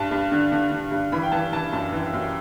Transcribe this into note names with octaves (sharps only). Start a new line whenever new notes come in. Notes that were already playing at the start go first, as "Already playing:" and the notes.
Already playing: G2 A5
G2
D3
D3
D3
G2
E3 B5
G5
E3 A5
E3 A5
F#2 A5
E3
F#2